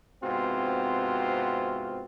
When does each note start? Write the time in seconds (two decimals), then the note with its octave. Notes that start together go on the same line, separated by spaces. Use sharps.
0.23 G#2 C3 B3 C4 F4 F#4